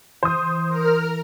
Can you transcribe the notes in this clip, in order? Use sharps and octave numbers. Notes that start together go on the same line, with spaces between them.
E3 C5 D#6
A#4 F6